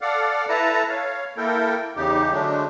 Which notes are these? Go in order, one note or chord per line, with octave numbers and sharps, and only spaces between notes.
A4 D5 F5 F#5
E4 A4 B4 A5 A#5
C#5 F5
A#3 E4 A4 A#4 G5
E2 C#3 D#4 G4
D3 F#3 G#3 A3 D4